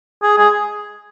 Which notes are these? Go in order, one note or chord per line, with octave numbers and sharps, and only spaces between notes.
G#4
G#4